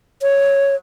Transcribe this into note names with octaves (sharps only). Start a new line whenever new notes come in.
C#5